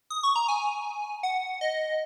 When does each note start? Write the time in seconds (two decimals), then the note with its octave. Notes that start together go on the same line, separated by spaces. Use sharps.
0.10 D#6
0.23 C#6
0.36 A#5
0.48 G#5
1.23 F#5
1.61 D#5